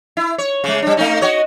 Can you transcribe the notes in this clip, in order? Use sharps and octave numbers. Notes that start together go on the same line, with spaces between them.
E4
C#5
C#3 G#3
G3 D4
A3 C#4 D#4
F#4 C#5 D#5